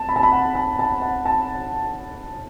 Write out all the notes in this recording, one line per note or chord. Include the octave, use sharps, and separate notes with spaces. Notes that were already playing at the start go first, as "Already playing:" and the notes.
Already playing: A5
B5
A5
B5
F#5
A5
A5
F#5
A5